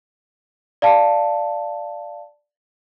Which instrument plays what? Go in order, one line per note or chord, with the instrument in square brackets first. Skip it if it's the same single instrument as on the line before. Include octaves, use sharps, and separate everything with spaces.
[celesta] D5 F5 A5